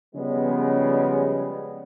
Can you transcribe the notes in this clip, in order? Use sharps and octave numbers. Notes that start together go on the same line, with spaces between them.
C#3 F3 G3 G#3 B3